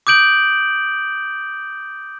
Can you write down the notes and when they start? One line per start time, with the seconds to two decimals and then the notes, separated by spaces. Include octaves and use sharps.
0.07 D6 D#6 G6 D7 F#7